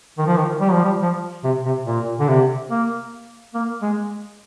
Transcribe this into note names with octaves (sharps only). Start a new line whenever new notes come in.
D#3
F3
D#3
G3
F3
G3
F3
C3
C3
A#2
D3
C3
A#3
A#3
G#3